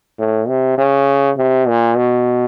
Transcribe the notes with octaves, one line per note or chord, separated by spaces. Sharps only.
A2
C3
C#3
C3
A#2
B2